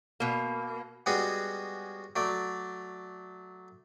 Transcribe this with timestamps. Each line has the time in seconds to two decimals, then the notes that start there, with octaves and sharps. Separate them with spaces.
0.20 B2 A#3
1.06 G3 G#3 B3 C#4 F#4 G#4
2.16 F#3 A3 D5